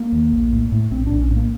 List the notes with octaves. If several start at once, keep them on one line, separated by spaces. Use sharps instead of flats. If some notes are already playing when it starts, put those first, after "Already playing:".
Already playing: A#3
D#2
A#1
A2
A2
A#1 C4
A#1 D4
C#4
A2
A#3